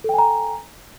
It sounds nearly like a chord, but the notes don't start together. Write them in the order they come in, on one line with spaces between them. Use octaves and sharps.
A4 G5 G#5 A#5